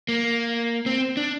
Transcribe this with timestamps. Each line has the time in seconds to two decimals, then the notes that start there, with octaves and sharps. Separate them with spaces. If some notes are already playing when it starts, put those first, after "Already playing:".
0.09 A#3
0.86 C4
1.17 D4